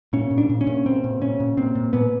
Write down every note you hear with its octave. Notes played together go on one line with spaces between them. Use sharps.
A#2 C#4
A#2
D4
A#2
C#4
A#2
A#2 C4
A#2
A#2 C#4
A#2
A#2 C4
A#2
A#2 B3